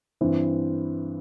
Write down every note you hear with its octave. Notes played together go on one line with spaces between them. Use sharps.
G2 E3 C4 E4